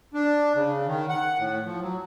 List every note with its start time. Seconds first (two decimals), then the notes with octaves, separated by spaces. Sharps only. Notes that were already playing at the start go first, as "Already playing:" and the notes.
0.14 D4
0.55 C#3
0.87 D#3
1.09 F#5
1.38 A2
1.65 F3
1.82 F#3